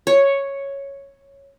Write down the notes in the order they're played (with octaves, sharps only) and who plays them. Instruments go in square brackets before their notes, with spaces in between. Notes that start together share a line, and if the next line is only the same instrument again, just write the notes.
[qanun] C#5